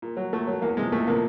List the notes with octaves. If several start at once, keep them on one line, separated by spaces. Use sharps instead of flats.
A#2
F#3
A#2 A3
F#3
E2 A#3
C3 F3 G#3
E2 A3
C3 F3 A#3